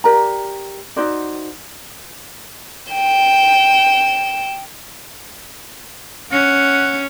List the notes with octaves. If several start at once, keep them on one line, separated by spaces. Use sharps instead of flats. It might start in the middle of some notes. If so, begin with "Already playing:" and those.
G4 A#4 D5 A#5
D#4 F#4 C5 D5
G5 E7
C#4 F#5